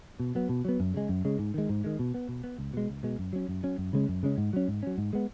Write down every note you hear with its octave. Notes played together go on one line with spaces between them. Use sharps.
B2
F#3 B3
B2
F#3 B3
F#2
C#3 G#3
F#2
C#3 G#3
G#2
D#3 G#3
G#2
D#3 G#3
B2
B3
B2
B3
C#2
B2 G#3
C#2
B2 G#3
F#2
F#3 C#4
F#2
F#3 C#4
F#2
C#3 G#3 C#4
F#2
C#3 G#3 C#4
G#2
F#3 C#4
G#2
F#3 C#4
G#2
G#3 B3